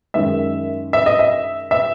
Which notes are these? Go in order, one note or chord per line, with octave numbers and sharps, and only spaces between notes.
F#2 D#3 G#3 E5
E5
D#5
E5
E5